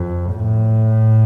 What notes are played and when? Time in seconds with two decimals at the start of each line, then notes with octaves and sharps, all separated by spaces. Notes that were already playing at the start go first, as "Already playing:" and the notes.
Already playing: F2
0.33 A2